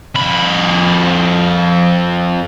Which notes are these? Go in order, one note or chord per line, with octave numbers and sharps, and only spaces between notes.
F2 B5